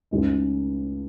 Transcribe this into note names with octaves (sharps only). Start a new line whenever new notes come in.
C#2 C#3 G#3 D#4